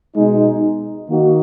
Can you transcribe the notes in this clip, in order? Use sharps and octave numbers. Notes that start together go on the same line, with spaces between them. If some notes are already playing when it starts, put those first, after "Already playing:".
B2 G#3 D#4
D#3 A#3 D#4 F#4